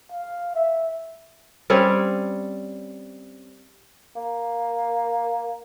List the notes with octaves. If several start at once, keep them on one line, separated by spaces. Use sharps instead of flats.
F5
E5
G3 C4 C#4 C#5
A#3